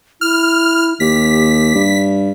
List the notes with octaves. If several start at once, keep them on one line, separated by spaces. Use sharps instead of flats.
E4 F6
D#2 G4 B6
G2